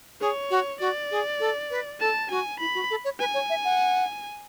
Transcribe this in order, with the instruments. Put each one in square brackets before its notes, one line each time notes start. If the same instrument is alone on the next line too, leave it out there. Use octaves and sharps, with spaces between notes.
[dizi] G#4 [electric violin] C#5
[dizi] F#4
[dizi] F#4 [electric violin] D5
[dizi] G#4
A4
B4
[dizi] A4 [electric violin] A5
[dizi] F#4 [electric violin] G#5
[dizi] E4 [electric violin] B5
[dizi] F#4
A4
C#5
[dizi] B4 [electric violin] G#5
[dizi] C#5
E5
F#5